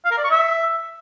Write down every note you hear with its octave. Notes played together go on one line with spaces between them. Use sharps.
F5
A#4
D5
C#6
E5